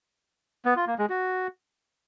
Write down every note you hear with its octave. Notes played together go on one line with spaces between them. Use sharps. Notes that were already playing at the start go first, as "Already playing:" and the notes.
B3
F4
A#3
G#3
F#4